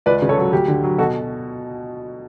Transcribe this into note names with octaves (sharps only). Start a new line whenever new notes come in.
C#2 B4 D5
C#3
A4 C#5
F#3
D2 G4
D3
F#3
B2 F#4 A4